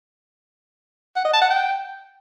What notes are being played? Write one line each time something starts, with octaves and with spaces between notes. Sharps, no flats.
F#5
D#5
A5
F#5
G5